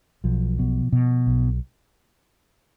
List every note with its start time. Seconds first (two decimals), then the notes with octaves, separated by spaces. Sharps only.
0.24 B1 F3
0.59 B2
0.93 B2
1.27 B1